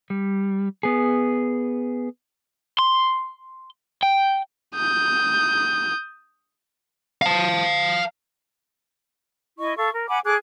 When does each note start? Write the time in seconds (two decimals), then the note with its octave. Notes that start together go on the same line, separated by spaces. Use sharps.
0.10 G3
0.83 B3 G#4
2.79 C6
4.03 G5
4.76 D#6 G6
7.22 F5 A5
9.58 E4 D#5 C#6
9.76 A4 F5 C#6
9.93 A#4
10.09 F#5 G#5 B5 D6
10.25 G#4 A4 D6 F#6